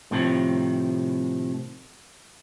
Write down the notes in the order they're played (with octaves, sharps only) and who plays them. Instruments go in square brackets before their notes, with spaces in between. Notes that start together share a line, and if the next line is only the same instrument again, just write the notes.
[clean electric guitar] A2 C3 D#3 F3